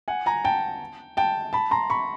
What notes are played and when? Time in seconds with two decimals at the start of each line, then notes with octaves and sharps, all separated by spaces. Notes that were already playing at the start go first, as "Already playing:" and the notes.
0.08 F#5 G#5
0.26 G#5 A#5
0.44 G5 A5
1.17 G5 A5
1.53 A5 B5
1.71 A#5 C6
1.90 B5 C#6